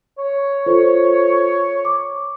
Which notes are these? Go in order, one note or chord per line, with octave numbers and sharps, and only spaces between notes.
C#5
F4 A4 C5
D6